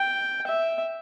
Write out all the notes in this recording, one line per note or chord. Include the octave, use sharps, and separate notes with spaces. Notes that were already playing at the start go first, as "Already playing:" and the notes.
Already playing: G5
E5